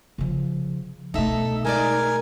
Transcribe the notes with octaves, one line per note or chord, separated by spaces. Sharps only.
C#3 F3
B1 A3 D#4 A4 E5
G#3 D#4 A#4 D5 G#5